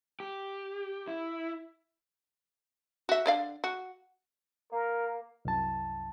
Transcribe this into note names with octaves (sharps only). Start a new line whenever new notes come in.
G4
E4
F#4 E5
D3 D5 F5
F#4
A#3 A#4
C2 F#2 A5